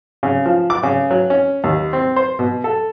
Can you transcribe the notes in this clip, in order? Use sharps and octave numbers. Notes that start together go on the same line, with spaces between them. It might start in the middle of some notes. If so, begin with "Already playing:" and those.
C#3
F3
D6
C#3
F#3
C#4
D#2
C4
C5
B2
A4